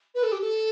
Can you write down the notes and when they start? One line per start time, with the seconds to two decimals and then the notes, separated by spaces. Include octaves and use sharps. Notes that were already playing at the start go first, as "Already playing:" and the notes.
0.15 B4
0.23 A4
0.32 G4
0.41 A4